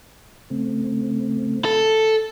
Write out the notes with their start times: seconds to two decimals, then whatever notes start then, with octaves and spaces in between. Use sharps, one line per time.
0.50 C#3 A3 C4
1.65 A4